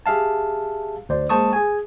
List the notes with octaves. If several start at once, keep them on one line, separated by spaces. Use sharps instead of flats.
G4 G#4 E5 F5 A5
D2 C5 D5
G#3 A#3 C5 A5 C#6 D#6
G#4 G#5